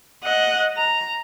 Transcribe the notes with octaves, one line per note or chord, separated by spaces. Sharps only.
D#5 F#5
A#5